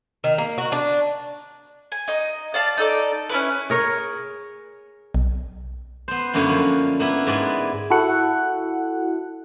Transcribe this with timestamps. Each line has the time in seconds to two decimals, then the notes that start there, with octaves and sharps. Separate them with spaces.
0.24 D#3
0.38 A#3
0.58 F#4
0.72 D4
1.92 G#5
2.08 D#4 D#5
2.54 D5 F5 A5
2.77 D#4 A4 D5
3.30 C#4 E4 B4
3.70 G#4 A#4 C#5
5.14 B1
6.08 B3 C5
6.34 F#2 D3 A#3 C#4 E4
6.49 F3
6.99 A#3 B3 E4
7.27 G#2 B3 D5 G#5
7.90 E4 F#4 A4 F#5